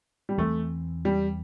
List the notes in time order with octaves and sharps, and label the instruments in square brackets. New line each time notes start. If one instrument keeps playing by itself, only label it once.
[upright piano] G3
[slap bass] E2 E3 C4 [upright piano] A3
[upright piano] G3